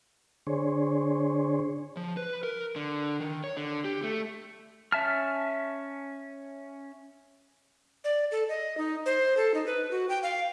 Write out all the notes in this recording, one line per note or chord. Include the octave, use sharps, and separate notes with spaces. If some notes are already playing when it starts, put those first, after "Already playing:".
D3 D4 G#4 C5 C#5
F3
B4
A#4
D3
D#3
C#5
D3
G4
A3
C#4 E5 A5 F6
D5
A4
D#5
D#4
C5
A4
D#4
B4
F#4
G5
F5